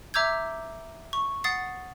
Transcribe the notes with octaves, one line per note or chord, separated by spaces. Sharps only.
E5 A#5 D6 E6 G6 G#6
C#6
F#5 D#6 A6 C7